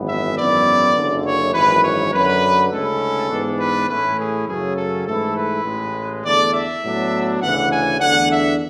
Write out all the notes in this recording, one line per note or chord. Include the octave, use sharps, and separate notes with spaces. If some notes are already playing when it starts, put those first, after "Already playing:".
Already playing: G#1 F#2 E3 B3
E5
G#1 F#2 E3 B3 E4 D5
F#1 F#2 D3
C#5
G#1 F#2 E3 B4
C#5
F#2 D3 F#3 B4
D2 C#3 G#3 C#4 E4 A4
G#2 E3 B3 D4
B4
A2 E3 A3 C#4 E4 B4
G#4
F#2 C#3 F#3 A3 C#4 G#4
A4
G#2 E3 A3 E4 A4
B4
A1 A2 G#3
E2 D3 A3 D4 D5
E5
A2 F#3 B3 D4
D2 C#3 E3 F#5
G#5
E2 D3 A3 D4 F#5
E5